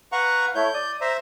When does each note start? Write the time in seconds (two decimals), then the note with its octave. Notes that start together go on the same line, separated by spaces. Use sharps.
0.12 B4 F5 F#5 A#5 C#6
0.55 A3 E4 C#5 G6
0.74 D5 D#6
1.01 C5 E5 A#5